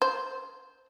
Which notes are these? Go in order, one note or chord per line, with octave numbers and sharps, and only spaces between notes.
C5